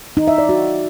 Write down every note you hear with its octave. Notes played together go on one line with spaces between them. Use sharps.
D#4
E5
D5
F#4